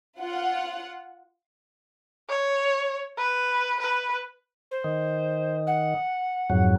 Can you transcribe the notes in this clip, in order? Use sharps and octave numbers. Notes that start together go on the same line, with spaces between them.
F4 F#5
C#5
B4
B4
C5
D#3
F#5
F2 G#2 F#3